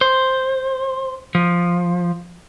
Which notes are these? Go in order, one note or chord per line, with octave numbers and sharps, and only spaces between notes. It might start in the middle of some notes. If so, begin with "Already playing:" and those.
C5
F3